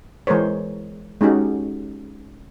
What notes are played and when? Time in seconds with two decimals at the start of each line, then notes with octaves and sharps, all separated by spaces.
0.27 E3 G#3 A#4 C5 C#5
1.21 G#3 C#4 D#4 F#4 G4